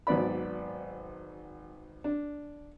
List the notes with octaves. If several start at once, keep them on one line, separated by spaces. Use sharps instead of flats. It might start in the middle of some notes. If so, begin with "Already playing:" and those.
G#1 F#3 B3 D5 B5
D4